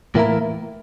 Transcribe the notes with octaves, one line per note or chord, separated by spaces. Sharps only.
A2 E3 A#3 E4 A#4